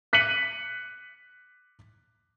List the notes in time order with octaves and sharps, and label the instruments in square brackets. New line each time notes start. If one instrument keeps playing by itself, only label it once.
[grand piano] F#6 B6 C#7 D#7 F#7